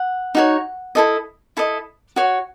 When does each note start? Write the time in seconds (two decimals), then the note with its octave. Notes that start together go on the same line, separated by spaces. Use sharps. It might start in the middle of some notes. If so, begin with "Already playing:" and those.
Already playing: F#5
0.35 D#4 F#4 C#5
0.95 E4 A4 D#5
1.57 E4 A4 D#5
2.16 F#4 C#5